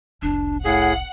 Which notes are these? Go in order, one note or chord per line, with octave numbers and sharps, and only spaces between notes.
F1 C2 D4
A2 G#4 F5 F#5